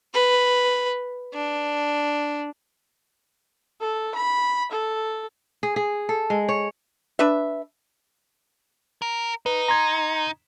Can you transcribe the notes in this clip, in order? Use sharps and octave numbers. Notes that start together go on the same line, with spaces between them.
B4
D4
A4
B5
A4
G#4
G#4
A4
G#3
C#5
D4 B4 E5
A#4
D#4 B4
A#5 C6 G#6